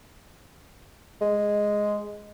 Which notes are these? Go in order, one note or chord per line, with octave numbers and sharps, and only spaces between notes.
G#3